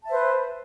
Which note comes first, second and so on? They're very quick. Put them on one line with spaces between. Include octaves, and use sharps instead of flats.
A5 E5 C5 B4